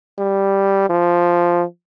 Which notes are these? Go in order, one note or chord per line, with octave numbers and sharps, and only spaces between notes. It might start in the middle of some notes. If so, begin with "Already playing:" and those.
G3
F3